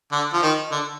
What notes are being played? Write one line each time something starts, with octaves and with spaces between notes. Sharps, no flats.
D3
F3
D#3
D3